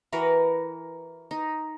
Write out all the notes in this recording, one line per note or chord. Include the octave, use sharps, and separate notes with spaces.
E3 F#4 A#4 B4
D#4